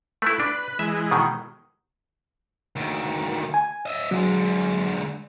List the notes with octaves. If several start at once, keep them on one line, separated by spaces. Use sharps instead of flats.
A3 E4 B4
D4
E3 G#3 E5
B2 D#3
D2 D#3
G#5
D#5 E5
D3 F#3 G#3